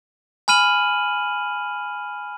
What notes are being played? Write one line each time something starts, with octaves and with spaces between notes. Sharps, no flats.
G#5 B5 F6 D#7 F#7